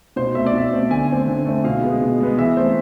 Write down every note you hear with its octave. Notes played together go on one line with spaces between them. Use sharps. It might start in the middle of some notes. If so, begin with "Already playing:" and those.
B2 C5
A3 C4 E5
D5
B2 E5
A3 C4
D3 G#5
A3 C4
D3
A3 C4
B2 F5
G#3 B3
B2
G#3 B3
E3 E5
A3 C4 C5